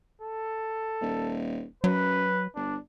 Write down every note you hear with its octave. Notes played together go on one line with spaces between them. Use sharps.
A4
D#1
F#2 F#3 B4
G1 D4